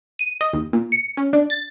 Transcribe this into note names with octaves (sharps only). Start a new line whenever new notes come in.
D#7
D#5
D#2
A#2
C#7
C#4
D4
A6